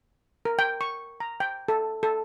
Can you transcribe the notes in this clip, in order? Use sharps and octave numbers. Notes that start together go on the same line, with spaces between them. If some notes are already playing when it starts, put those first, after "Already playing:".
A#4
G5
C#6
A#5
G5
A4
A4